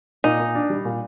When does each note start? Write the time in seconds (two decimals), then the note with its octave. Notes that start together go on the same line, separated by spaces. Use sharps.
0.24 A#2 D#4
0.39 A#2
0.55 D4
0.70 G3
0.85 A#2